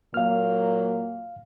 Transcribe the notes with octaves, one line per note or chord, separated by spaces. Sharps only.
A#2 F#3 A#3 F5 F6